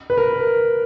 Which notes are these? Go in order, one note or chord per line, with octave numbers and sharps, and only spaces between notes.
B4
A#4